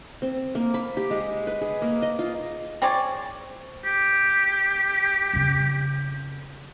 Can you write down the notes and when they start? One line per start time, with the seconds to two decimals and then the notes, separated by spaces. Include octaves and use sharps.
0.22 C4
0.55 A#3
0.74 B5
0.97 G4
1.11 G#3
1.47 B4
1.61 G#4
1.82 A#3
2.02 D#5
2.19 F4
2.82 C4 G#4 C#5 D5
3.85 G4
5.33 F2 C#3